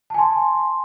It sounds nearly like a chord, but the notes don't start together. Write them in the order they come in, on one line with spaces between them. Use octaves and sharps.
A5 G#5 C6